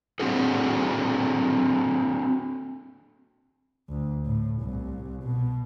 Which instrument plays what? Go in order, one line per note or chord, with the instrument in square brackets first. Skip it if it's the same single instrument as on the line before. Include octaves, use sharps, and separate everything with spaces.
[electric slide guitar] C4 D4 F#4 G#4 A4
[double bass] D2
A2
C2
B2